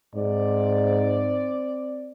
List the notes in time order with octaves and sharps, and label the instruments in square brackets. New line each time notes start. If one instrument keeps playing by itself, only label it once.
[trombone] G#2 [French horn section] C4 D5